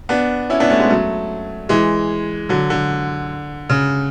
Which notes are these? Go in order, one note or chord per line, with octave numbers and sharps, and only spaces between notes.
B3 D4
C#4 E4
B3 D4
A3 C#4
G#3 B3
F#3 A3
E3 G#3
D3 F#3
D3
C#3